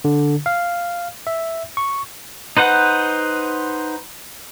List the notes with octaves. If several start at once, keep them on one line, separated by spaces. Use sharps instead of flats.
D3
F5
E5
C#6
D#4 B4 C5 F#5